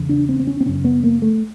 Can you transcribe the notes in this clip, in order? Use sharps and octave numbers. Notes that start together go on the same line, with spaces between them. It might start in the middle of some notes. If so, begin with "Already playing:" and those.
Already playing: E2 C#3
D4
C4
C4
C#4
C4
F#2 C#3 C#4
B3
A#3
A3